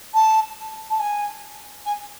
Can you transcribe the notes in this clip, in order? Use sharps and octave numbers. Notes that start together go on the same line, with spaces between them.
A5
A5
G#5
G#5